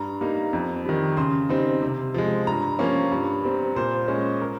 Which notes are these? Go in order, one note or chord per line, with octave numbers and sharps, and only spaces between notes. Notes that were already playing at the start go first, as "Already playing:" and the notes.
Already playing: G2 A#5
G3 A#3 D#4
F2
D#3 G3
C#3 C6
G3 C4 D#4
C3
F3 G#3
G2 A#5
F3 A#3 C#4
G2
G3 C4
A#2 C5
G#3 C#4
A#4